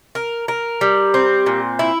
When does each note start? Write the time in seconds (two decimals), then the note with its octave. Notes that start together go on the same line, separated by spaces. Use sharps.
0.15 A#4
0.48 A#4
0.81 G3
1.14 C4
1.46 A#2
1.79 E4